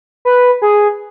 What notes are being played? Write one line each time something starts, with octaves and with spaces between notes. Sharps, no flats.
B4
G#4